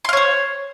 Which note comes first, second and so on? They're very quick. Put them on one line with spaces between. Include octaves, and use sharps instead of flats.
C6 F5 C#5 C5